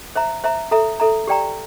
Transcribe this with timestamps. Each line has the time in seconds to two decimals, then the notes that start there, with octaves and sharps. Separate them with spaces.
0.16 C5 E5 A#5
0.44 C5 E5 A#5
0.71 A4 E5 A#5
1.00 A4 E5 A#5
1.27 G4 D5 G5 A#5